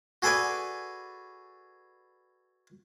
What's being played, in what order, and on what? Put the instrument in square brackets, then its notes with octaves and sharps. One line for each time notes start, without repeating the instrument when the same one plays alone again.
[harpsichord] F#4 G#4 A4 B4 D5 G#5